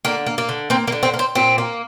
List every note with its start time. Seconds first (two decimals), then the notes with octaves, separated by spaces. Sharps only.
0.05 D3 A#3
0.26 A#3
0.38 A#3
0.49 D3
0.70 A#3 C4
0.88 A#3
0.92 D3
1.03 C4
1.14 A#3
1.19 C4
1.35 A#2 C4
1.58 A#3